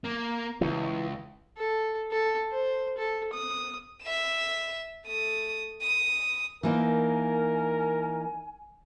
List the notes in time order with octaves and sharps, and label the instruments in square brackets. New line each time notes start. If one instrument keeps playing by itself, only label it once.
[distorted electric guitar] A#3
[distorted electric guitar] C#2 [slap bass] E3
[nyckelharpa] A4
A4
C5
A4
D#6
[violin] E5 E7
A3 D#6
D#6
[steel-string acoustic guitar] E3 A#3 D#4 [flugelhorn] A#4 [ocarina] G#5